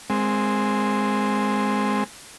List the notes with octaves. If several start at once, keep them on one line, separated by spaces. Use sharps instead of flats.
G#3 C4